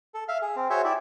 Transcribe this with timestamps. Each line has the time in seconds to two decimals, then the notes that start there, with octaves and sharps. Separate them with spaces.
0.14 A4
0.28 E5 F5
0.42 G#4
0.56 C4
0.70 F#4 G#4 C5 C#5 E5
0.84 E4 G4 D5 E5